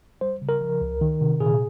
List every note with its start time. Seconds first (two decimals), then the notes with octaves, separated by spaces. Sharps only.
0.21 G3 C5
0.42 C#3
0.49 A#4
0.61 F3
0.81 C#2
1.01 D#3
1.21 C3
1.40 A#2 G#4